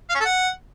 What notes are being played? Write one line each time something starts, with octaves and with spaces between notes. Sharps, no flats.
F5
C#4
A4
F#5